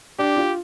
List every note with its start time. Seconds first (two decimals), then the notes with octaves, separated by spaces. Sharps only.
0.19 D4 G4
0.36 F4